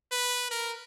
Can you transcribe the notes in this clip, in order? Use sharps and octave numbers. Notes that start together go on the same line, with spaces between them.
B4
A#4